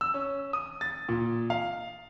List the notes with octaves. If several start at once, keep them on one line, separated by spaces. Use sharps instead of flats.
E6
C#4
D#6
A6
A#2
F5